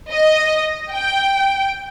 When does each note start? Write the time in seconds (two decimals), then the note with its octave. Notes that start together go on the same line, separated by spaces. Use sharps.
0.11 D#5
0.91 G5